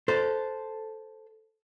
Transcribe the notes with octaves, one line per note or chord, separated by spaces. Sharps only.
A4 C5